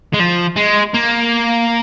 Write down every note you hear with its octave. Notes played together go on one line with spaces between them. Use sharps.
G#3
F3
G#3
A#3